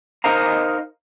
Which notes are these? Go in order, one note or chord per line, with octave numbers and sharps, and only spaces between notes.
D#4 A#4 C5 D#5 F5 A#5